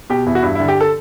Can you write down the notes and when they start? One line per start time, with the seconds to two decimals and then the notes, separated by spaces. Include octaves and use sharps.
0.10 B2 G4
0.26 E2 E4
0.35 F#4
0.42 G2 E4
0.55 E4
0.60 D3
0.68 G4
0.81 A4